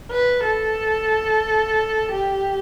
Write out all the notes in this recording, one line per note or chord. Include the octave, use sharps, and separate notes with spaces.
B4
A4
G4